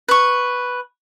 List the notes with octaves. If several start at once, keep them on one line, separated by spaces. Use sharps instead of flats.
B4 C#6